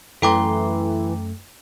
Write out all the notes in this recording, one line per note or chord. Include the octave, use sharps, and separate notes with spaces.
F#2 E3 A3 A4 G5 A#5 C6 D6